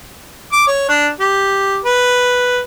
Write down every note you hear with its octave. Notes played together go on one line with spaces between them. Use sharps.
D6
C#5
D4
G4
B4